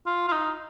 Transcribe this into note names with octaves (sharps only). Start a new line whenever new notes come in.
F4
F4
D#4